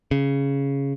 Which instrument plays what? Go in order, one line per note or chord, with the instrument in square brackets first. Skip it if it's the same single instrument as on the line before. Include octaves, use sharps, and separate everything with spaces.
[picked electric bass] C#3